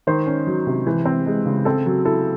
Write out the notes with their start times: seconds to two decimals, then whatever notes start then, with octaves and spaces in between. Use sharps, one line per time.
0.07 D#3 C5
0.27 C#4
0.47 F#3
0.67 C3
0.87 E3
1.06 C4
1.26 G#3
1.46 C#3
1.65 C4 A4
1.86 F#3
2.05 E4 A4